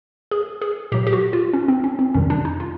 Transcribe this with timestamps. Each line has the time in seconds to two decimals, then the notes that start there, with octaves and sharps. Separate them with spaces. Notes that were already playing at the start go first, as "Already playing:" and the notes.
0.31 G#4
0.62 G#4
0.92 A#2 F#3 G4
1.07 G4
1.13 F#4
1.33 F4
1.53 C#4
1.68 C4
1.84 C#4
1.99 C4
2.14 F2 C3 D#3 G3 C#4
2.30 D4
2.45 D#4
2.60 F4